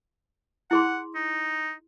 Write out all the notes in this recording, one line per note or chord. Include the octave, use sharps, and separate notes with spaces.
E4 G#4 F#5 C6
D#4